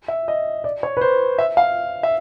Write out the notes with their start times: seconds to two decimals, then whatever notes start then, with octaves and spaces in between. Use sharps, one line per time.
0.08 E5
0.28 D#5
0.64 D5
0.83 C#5
0.97 B4
1.01 C5
1.38 E5
1.57 F5
2.03 E5